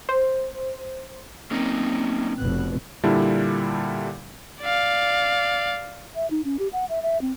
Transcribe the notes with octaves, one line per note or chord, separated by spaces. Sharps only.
C5
F#3 A#3 C4 C#4 D#4
F1 B2 F#6
A#2 D3 G3 D4 E4
D5 F5
E5
D#4
C#4
G4
F#5
E5
E5
C4